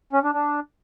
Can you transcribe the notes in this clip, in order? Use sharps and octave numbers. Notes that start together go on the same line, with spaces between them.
C#4
D4
D4